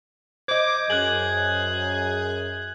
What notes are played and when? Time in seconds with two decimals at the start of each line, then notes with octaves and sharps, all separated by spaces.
0.48 C5 D#5 D6 G6 G#6
0.90 F#2 G#4 F#6 G#6 F#7